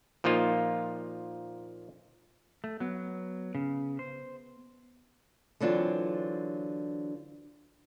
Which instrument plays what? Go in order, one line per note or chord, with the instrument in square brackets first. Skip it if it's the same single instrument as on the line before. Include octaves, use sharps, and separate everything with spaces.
[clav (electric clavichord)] A#2 F3 A#3 D#4 F4
[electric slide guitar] A3
[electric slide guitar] F#3 [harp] B3
[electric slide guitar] C#3
C5
[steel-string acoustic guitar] D3 E3 F#3 C4 D4 F4